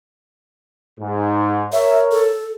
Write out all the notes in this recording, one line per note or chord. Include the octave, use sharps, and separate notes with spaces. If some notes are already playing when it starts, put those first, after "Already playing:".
G#2
A#4 C#5 E5
A4